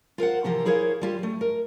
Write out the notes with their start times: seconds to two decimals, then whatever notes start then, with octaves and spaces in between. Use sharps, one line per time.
0.18 F4 A#4 C5 F#5
0.44 C3 E3 F3 F4 G4 A#4
0.65 E4 G#4 A#4 C5 C#5 F5
1.01 G3 F4 G4
1.19 G3 A3
1.41 A#4